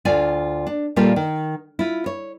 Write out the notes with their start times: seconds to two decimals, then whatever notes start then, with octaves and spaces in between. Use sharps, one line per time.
0.05 D2 F4 D5 G#5
0.67 D4
0.96 A#2 G3 A#3 F4 G4 A4
1.16 D#3
1.79 E4 F4
2.06 C#5